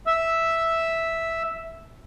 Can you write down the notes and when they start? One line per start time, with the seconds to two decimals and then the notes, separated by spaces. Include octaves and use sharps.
0.07 E5 E6